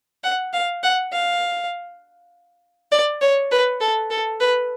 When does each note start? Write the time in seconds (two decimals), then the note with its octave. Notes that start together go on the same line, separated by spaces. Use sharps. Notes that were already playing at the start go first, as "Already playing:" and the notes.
0.24 F#5
0.53 F5
0.83 F#5
1.13 F5
2.92 D5
3.22 C#5
3.51 B4
3.81 A4
4.10 A4
4.40 B4